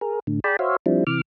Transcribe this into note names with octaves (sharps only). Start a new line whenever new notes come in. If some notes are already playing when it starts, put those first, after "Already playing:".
G#4 A#4
A2 D3
G#4 D5 G5 A5 B5
F#4 C5 C#5 E5 F5
F3 G3 C4 D4 E4
C3 E3 D6 F6